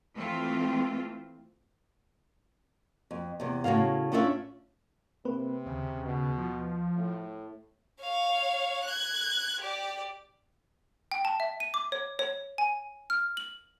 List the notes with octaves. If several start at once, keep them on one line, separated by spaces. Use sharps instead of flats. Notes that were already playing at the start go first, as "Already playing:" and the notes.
E3 A3 C4 F4
F2
E2 C3
A2 C#3 F#3 F#4 F5
A2 C#4 D4 F4 D#5 E5
C3 A#3 C4 B4
D#2 C#3
B2
F3
A2
C#5 F5
F#6 G#6
G4 D5
G5
A5
E5
D#7
D6
C#5
C#5
G#5
F6
F#7